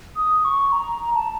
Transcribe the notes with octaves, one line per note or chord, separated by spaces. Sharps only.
D#6
C#6
A#5
A5